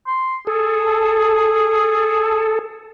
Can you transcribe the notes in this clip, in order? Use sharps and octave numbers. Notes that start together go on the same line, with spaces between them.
C6
G#4 A4